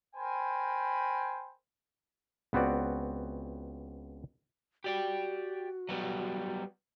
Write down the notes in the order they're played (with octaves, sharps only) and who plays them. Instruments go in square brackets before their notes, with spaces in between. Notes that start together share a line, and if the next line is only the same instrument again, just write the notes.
[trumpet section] A#4 C5 G5 G#5 B5
[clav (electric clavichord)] C#2 B3 C4 F#4 D5
[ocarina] F#4 [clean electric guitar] G4 D5 G5
[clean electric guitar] F#3 G3 B3